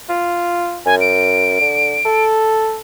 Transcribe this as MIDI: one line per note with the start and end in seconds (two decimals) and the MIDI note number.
0.09 0.80 65
0.86 1.58 42
0.86 0.95 80
1.01 2.24 98
1.60 1.99 50
2.05 2.80 69